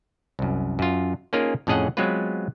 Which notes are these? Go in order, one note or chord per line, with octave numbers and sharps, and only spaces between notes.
C2 F#2
F#2 F4
A#3 C#4 D#4 F4 G#4 A#4
F2 A2 C#4 G#4 D#5 F#5
F#3 G#3 B3 C4 F4 B4